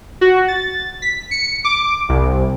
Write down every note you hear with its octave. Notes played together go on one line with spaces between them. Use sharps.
F#4
A6
B6
C#7
D6
C2